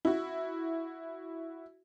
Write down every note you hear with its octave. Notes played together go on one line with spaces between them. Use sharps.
E4 F#4